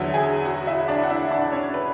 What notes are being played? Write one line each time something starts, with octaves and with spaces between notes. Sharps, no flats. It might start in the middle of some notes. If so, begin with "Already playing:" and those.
Already playing: E2 D3 F#3 B3 E4 E5
G#4 G#5
F#4 F#5
E4 E5
D4 D5
F#5
E4 E5
D4 D5
C#4 C#5
B4